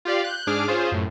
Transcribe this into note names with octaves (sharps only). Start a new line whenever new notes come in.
F4 G4 D5 F5
F#6 G6
G#2 D4 G#4 D6 F6
C#4 F4 G#4 C5
F#2 A2